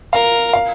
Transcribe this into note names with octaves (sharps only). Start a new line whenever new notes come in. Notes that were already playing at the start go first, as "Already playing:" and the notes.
A#4 F5
F5